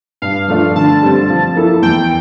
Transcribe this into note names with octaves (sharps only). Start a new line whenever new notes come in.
G2 F5
F3 A3 D4 F4
D3 A5
G3 C4
F3
A#3 E4 A4
E2 G5